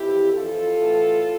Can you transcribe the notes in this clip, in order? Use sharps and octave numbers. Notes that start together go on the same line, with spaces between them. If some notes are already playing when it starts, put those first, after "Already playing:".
Already playing: F2 E3 E4 G4
F2 E3 F4 A4
A2 E3